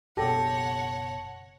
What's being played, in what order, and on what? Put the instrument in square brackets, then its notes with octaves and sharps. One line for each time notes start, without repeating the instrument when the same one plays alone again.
[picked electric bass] F#1 B2 [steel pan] G4 A4 [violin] C#5 F#5 [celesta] A5 A#6